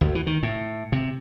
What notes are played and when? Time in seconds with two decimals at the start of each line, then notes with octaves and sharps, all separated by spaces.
0.01 D2
0.15 E3
0.27 D#3
0.43 A2
0.92 C3